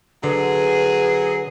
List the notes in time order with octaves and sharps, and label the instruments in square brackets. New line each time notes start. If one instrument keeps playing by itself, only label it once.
[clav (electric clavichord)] D3 [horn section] F#3 G#4 [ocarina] B4